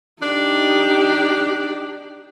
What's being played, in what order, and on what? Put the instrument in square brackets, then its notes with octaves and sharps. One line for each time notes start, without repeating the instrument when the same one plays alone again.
[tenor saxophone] D4 [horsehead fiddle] D#4 G4